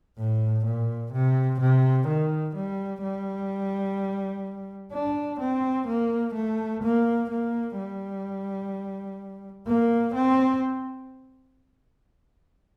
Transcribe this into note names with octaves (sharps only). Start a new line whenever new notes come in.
A2
A#2
C3
C3
D#3
G3
G3
D4
C4
A#3
A3
A#3
A#3
G3
A#3
C4